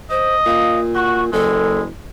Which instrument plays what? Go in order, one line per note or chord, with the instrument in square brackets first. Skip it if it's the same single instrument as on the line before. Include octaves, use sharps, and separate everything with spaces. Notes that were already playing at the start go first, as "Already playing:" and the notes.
[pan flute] C5 [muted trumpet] D#5
[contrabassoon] A#2 [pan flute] F5
[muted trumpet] F#4 [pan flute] C#6
[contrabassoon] F#1 [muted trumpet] G#3 [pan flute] A4